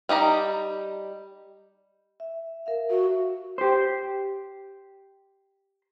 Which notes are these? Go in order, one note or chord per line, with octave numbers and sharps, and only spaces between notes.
G3 D#4 G4 A#5
E5
A#4 E5 F5
F#4
G4 C5